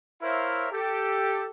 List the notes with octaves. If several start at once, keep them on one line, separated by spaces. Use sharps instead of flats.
E4 A#4 C5 C#5 E5 F5
G4 A4